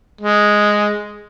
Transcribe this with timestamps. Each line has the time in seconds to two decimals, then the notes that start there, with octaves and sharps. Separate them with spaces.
0.21 G#3